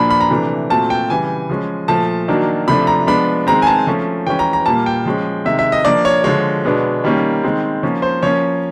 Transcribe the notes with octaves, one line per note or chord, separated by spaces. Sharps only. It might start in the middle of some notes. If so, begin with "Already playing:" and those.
Already playing: A#2 F3 A#3 D4 B5
B5
A#5
C3 E3 A3 D4
A#2 F#3 A3 C4 A5
G5
C#3 E3 G3 G#5
F3 G#3 C#4
A#2 F3 A3 A5
D#3 F#3 A#3 D4
C3 F3 A3 D4 B5
A#5
F3 G#3 B3 D4 B5
D#3 G#3 C4 A#5
G#5
A5
F3 A3 C#4
E3 G#3 C#4 G5
A#5
A#5
A#2 G3 A#3 A5
G5
F3 G#3 C#4
C3 D#3 G#3 E5
E5
D#5
F3 A#3 D4 D5
C#5
D3 F3 G#3 C#5
B2 G#3 B3 D4
D#3 G3 A#3 C#4
D#3 G#3 C4
F3 A#3 C#4
C5
F3 A#3 C#4 C#5